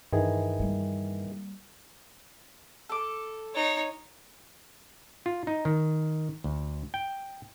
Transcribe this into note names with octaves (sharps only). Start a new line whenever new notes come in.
G2 D#3 E3 G#4
G3 A#3
A4 D6
D#4 C#5
F4
D#4
D#3
D2
G5